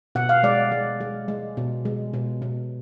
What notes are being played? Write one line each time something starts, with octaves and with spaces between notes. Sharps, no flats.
B2 F#5
F5
G#3 D5
G#3
G#3
G#3
B2
G#3
B2
B2